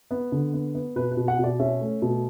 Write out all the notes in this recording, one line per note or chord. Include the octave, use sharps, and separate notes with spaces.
B3
D3
B3
B3
B2 B4
B4
B2
F#5
B2 D5
C#4 E5
A3
B2